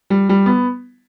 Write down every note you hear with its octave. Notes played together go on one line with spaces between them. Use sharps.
G3
G3
B3